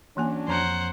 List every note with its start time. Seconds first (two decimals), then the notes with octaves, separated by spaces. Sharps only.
0.17 E3 F#3 A#3 C#4 D4 G#5
0.48 F2 C5 C#5 F#5 A#5